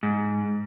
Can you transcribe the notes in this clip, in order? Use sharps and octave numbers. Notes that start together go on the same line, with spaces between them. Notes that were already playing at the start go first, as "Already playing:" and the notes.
G#2